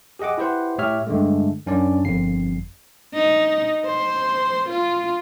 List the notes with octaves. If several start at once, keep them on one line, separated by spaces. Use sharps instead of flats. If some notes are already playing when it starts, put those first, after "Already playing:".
G4 G#4 D#5 F#5 D6
E4 G4 B4 C5 F#5
A2 G4 C#5 E5 F6
G2 D3 G#3 A3
F#2 C#4 D4 D5
G1 F2 C7
D#4
C5
F4